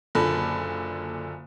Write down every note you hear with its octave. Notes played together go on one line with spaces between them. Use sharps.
F#1 A#2 D3 A4 B5